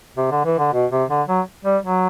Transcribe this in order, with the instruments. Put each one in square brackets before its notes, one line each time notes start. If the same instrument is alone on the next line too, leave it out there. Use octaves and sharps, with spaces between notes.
[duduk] C3
D3
E3
D3
B2
C3
D3
F#3
G3
F#3